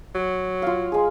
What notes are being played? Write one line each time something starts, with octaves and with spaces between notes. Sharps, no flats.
F#3
F4 F5
G#3 G#4